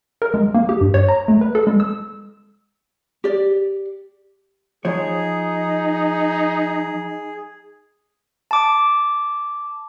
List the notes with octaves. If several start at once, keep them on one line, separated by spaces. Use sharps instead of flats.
A#4
G#3
A#3
G4
G2
C#5
A#5
A3
B4
A4
G#3
E6
G4 D5
F3 D#4 G#4 C#5
A5 D6